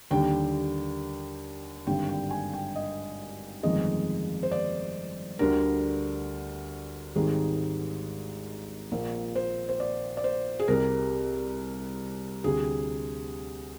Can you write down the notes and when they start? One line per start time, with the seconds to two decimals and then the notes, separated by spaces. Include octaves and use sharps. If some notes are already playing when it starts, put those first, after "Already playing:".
0.11 D#2 D3 G3 G5
1.87 G#1 G2 D3 G3 G5
2.09 G5
2.30 G#5
2.53 G5
2.76 D#5
3.63 G1 F2 D#3 G#3 D#5
4.43 C5
4.51 D5
5.39 D2 D3 G3 A#4
7.16 G#1 G#2 D#3 G3 G#4
8.92 A#1 A#2 F3 A#4
9.35 C5
9.69 C5
9.80 D5
10.17 D5
10.24 C5
10.59 G#4
10.68 C2 C3 G3 A#4
12.44 D2 C3 G3 G#4